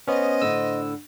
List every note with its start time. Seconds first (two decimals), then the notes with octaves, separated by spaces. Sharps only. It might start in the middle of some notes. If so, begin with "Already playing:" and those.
0.07 B3 C#4 C5 D#5
0.42 A2 D3 E6